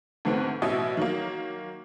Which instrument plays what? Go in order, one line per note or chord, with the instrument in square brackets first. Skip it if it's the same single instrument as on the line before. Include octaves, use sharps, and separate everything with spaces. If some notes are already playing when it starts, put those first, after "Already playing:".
[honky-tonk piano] D2 G#2 D#3 A3 B3 C4
A1 B2 E4 D#5 E5
D#3 F#3 A#3